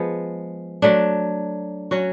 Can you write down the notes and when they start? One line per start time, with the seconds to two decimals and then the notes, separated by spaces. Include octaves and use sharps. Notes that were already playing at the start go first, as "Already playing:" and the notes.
Already playing: F3 G#3 B3
0.82 F#3 A3 D4
1.91 F#3 C#4 F#4